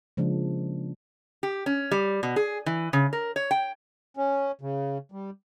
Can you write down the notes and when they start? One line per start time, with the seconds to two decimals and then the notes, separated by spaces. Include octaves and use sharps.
0.17 C#3 F3 G#3 A#3 D4
1.43 G4
1.66 C#4
1.91 G3
2.23 B2
2.36 G#4
2.66 E3
2.93 C#3
3.13 A#4
3.36 C#5
3.51 G5
4.17 C#4
4.61 C#3
5.12 G3